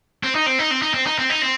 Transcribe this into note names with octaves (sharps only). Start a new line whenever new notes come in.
C4
D#4
C4
D#4
C4
D#4
C4
D#4
C4
D#4
C4